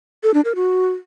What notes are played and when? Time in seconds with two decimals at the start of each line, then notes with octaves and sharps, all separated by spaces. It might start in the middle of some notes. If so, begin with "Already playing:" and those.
0.23 A4
0.34 D4
0.45 A#4
0.55 F#4